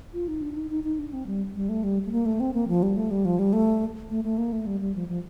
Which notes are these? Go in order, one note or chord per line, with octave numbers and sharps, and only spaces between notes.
F4
D#4
D4
D#4
D#4
D#4
D4
C4
G3
G3
A3
G3
A3
A#3
A3
C4
A#3
F3
G3
A3
G3
F3
G3
A3
A3
A3
A#3
A3
G3
G3
F3
F3